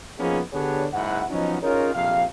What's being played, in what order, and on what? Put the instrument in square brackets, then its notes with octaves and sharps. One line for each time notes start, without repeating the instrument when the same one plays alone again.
[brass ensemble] F3 A#3 B3 C#4 D#4 G#4
D3 B3 D4 G4 G#4 C#5
F#1 G#2 E4 F#5
F3 F#3 B3 C#4 D#4
C#4 D#4 F4 G#4 A#4 C#5
A#1 F2 C3 F5